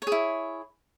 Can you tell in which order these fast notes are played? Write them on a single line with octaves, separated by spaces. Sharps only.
C#5 G#4 E4